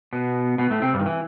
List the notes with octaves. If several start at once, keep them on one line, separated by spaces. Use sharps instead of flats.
B2 B3
B2 B3
A2 A3
C3 C4
G2 G3
D#3
E3